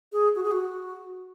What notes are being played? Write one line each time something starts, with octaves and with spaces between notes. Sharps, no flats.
G#4
F#4
G#4
F#4